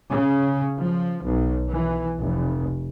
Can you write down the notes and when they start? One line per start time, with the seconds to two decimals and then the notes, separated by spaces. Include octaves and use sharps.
0.11 C#3
0.78 F3
1.22 B1
1.71 E3
2.21 F1